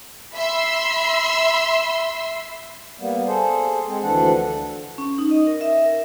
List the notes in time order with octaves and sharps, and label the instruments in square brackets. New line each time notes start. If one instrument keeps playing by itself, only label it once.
[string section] E5 B5 C6 E6
[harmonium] G3 A#3 B3
G#4 A4 C5
G#3 C4
D2 E3 F3 D4 A4 F#5
[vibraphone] C#4
D#4
D#5
A#4
E5
A#4